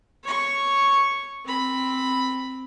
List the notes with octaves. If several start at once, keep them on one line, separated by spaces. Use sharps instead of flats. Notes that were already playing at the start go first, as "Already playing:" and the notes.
C#5 C#6
C4 B5